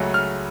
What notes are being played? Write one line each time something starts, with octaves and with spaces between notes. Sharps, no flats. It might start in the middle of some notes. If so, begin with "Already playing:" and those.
Already playing: C#2 C#3 F#3 A3
F6